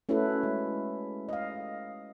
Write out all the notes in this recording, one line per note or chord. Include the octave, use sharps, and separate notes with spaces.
A3 C#4 E4 F#4 A4 B4
G#3
D#5 F5